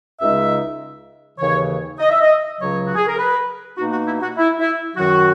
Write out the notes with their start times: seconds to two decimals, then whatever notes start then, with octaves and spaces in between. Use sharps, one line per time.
0.20 C#2 C#3 G#3 D#4 E5
1.39 D#2 C#3 E3 C#5
1.99 D#5
2.09 E5
2.21 D#5
2.58 C#2 C#3 F#3 C#5
2.85 F#4
2.95 G#4
3.07 A#4
3.18 B4
3.77 B2 A#3 D#4 F#4
3.92 F#4
4.07 E4
4.22 F#4
4.37 E4
4.59 E4
4.96 F#2 D#3 F#3 F#4